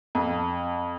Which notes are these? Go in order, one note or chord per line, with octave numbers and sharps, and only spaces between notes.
F2